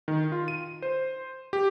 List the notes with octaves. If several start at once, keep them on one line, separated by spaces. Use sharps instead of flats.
D#3
F4
D#7
C5
G4